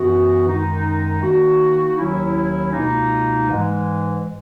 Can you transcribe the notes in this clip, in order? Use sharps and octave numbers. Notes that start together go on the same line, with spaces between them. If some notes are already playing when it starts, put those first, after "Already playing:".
Already playing: F#2 E3 B3 F#4
F#2 D#3 G#3 D#4
D#3 A#3 D#4 F#4
D#2 D#3 F#3 C#4 E4
C#2 B2 A#3 D#4
G#2 E3 G#3